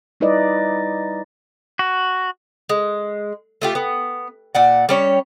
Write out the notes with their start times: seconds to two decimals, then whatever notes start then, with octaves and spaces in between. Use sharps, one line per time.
0.20 G3 D#4 E4 B4 D5 D#5
1.79 F#4
2.69 G#3
3.62 A3 F4 G4
3.75 B3
4.55 A#2 D5 F#5
4.89 G3 C#4 C#5